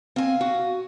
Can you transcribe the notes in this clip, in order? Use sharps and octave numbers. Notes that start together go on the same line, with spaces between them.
C4 F5 G#5
F#4